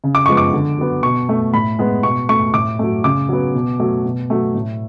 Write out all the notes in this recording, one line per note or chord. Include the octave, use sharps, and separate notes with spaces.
C#3
D6
F3 G#3 B3 C#6
D6
D3
F#3 B3
B2 C#6
A3
A2 B5
G#3 B3
B2 C#6
A3 C#6
A2 D6
F#3 A3
C#3 D6
F#3 B3
B2
F#3 A3
B2
F#3 A3
A2